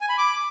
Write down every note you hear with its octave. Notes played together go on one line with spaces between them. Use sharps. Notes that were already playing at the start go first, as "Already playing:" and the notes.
G#5
B5
D6